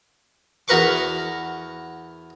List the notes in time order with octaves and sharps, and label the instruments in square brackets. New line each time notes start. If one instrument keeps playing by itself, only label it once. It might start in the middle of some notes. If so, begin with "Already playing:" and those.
[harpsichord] E2 F#4 A#4 B4 C#6 D6